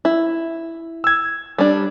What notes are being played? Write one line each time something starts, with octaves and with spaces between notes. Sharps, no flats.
E4
E6 G#6
G3 D4